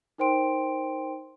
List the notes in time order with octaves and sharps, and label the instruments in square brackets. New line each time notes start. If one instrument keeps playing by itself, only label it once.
[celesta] D#4 A#4 C5 G5 C6 D7